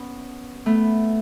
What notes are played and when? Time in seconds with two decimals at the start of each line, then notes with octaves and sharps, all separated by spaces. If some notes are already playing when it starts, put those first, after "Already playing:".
Already playing: B3 C#4
0.66 A3 B3